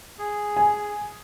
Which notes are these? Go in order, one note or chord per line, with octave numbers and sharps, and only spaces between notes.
G#4
G#5